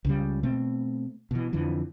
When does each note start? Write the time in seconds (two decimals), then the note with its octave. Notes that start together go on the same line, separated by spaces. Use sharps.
0.05 C#2 C#3 G3
0.43 B2 A3 C4
1.31 B2 E3
1.53 F2 D3 E3 F3